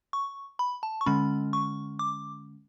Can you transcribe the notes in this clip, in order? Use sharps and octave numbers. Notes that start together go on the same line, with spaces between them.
C#6
B5
A5
C#6
D3 G#3 C#4 B5
C#6
D6